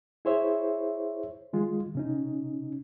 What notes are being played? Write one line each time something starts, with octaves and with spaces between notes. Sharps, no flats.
E4 G#4 C5 C#5 E5
D#3 G#3 F4
C3 C#4 D#4